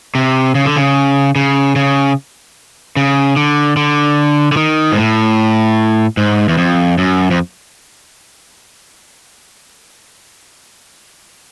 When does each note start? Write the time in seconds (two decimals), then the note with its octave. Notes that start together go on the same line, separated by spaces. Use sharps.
0.15 C3
0.55 C#3
0.66 D3
0.76 C#3
1.36 C#3
1.76 C#3
2.96 C#3
3.36 D3
3.77 D3
4.52 D3
4.57 D#3
4.92 G#2
4.97 A2
6.17 G#2
6.49 E2
6.58 F2
6.98 F#2
7.31 F2